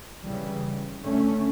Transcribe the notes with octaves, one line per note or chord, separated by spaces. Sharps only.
C#3 E3 G3
D3 A3 C#4